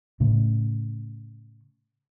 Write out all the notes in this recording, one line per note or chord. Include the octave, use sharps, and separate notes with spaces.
A2 C#3 A3